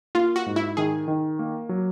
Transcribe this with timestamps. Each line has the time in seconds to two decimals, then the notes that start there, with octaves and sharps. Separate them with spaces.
0.15 A#3 F4
0.36 F#4
0.46 G#2
0.56 E4
0.77 D#3 G#4
1.08 D#3
1.39 A#3
1.69 F#3